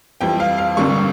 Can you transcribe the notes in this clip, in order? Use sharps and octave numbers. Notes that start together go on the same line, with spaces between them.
F2 E3 G3 G5
F5
F5
A1 G2 D3 G3 A#3 C#6